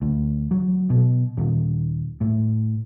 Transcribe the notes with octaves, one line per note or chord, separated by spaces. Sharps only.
D2
F#3
B2
D#1
A2